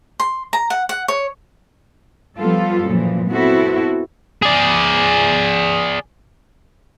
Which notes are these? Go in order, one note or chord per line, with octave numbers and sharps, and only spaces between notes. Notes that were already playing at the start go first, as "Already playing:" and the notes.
C6
A#5
F#5
F#5
C#5
F3 G3 B3 F4 A4
F#2 A#2 E3 F3
B3 C4 E4 F#4 A4
G#4 D5